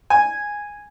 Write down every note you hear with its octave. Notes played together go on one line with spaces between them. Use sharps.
G#5